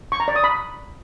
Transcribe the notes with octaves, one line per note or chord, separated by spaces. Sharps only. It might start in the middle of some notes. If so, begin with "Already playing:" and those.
C#6
A#5
D5
D#6
B5